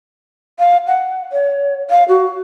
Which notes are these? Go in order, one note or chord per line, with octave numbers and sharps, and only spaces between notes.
F5
F#5
C#5
F5
F#4